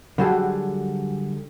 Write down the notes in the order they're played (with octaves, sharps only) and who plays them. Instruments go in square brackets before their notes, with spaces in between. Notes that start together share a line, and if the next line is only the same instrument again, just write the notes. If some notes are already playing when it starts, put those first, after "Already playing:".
[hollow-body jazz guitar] D3 F#3 G3 F#4 G#4 A4